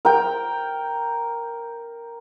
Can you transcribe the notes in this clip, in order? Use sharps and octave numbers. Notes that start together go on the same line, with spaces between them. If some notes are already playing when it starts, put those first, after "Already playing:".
A#4 G5